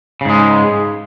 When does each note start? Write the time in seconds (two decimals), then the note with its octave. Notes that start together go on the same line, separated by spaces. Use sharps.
0.21 C#3
0.25 G#2
0.30 G#3